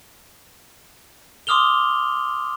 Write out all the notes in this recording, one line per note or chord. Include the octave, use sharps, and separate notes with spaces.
C6 D6 D#6 F6 F7 G7